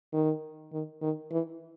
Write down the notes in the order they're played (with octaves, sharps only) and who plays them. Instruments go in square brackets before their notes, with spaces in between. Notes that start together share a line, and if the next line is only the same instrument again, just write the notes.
[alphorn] D#3
D#3
D#3
E3